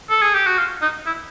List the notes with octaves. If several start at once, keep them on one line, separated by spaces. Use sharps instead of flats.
A4
G#4
G4
F#4
F4
D#4
E4